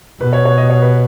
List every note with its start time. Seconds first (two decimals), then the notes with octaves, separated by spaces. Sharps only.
0.21 B2 B4
0.33 C#5
0.45 C#5
0.57 D#5
0.70 C#5
0.82 B4